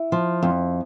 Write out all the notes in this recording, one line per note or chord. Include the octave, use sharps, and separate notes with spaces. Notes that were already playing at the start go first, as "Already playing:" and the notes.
Already playing: E4
F3
F2